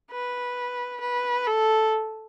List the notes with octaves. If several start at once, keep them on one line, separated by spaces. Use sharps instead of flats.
B4
B4
A4